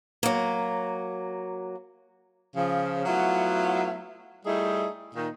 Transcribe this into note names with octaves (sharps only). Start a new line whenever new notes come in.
F#3 A#3
C#3 F3
F#3 A3 B3 E4 F4
G3 A3 D#4 E4 G#4
A#2 D#3 D#4